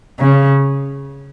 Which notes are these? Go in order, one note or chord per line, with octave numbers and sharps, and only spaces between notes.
C#3